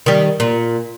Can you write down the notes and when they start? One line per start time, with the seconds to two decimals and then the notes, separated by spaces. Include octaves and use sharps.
0.06 D#3 G3
0.40 A#2